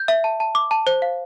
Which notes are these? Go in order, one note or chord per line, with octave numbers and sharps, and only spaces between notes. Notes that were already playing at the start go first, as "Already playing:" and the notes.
Already playing: G6
E5
A5
A5
D6
A5
C5
F5